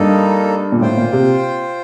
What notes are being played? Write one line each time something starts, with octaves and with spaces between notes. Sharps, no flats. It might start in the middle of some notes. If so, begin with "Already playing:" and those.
Already playing: G2 A#3 D#4 A4
A#2
A2 F4 C5 G5
A#2
C3